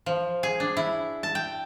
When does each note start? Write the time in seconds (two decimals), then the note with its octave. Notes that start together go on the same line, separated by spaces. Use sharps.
0.06 F3
0.43 G#4
0.60 D4
0.77 E4
1.23 A5
1.35 G5